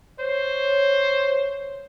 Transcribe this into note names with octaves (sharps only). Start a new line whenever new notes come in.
C5 C#5